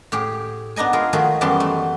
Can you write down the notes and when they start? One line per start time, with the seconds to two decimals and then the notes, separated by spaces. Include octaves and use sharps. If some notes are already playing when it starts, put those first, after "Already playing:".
0.12 A2 G4 G#4
0.76 B3 D4 D#4 D#5 G#5
0.93 F4 G#4 A#4
1.13 D#3 F3 A3 F#4 G#4
1.41 F#2 E3 G3 B3 A5 C6
1.60 A3